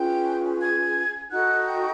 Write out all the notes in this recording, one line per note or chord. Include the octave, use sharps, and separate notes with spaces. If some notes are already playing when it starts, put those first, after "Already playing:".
Already playing: C#4 F4 G#4 B4 G5 G6
G#5 G#6
D#4 F#4 A4 F#5 F#6
G5 G6